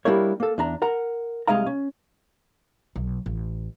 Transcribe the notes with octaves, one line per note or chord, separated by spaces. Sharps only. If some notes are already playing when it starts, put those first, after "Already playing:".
G3 A#3 D4 E4 A#4 C#5
A#3 A4
E2 D4 A#5
A#4 F#5 A#5
C2 B2 G#3 D#5 F5 A#5
C#4
B1
A1